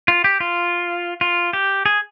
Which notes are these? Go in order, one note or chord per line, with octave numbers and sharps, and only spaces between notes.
F4
G4
F4
F4
G4
G#4